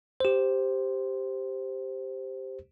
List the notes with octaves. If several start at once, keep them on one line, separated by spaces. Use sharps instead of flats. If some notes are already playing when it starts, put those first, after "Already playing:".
G4 C5